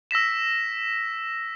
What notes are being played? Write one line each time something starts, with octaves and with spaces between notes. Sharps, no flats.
E6 A#6 B6 E7